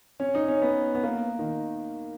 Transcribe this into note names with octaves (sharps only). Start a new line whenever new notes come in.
C#4
D#4
C#4
B3
B3
A#3
D#3